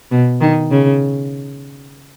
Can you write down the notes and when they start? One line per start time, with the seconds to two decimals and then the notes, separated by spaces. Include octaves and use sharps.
0.11 B2
0.41 D#3
0.71 C#3